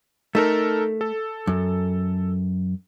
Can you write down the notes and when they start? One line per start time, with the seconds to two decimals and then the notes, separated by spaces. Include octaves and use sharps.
0.35 A3 D#4 A4 A#4
1.01 A4
1.47 F#2